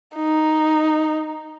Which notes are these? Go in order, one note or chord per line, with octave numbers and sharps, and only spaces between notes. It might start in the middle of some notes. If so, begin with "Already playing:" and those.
D#4